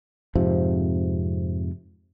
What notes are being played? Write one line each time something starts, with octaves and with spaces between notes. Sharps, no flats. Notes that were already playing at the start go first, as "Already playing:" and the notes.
F2 G#2 C3 F3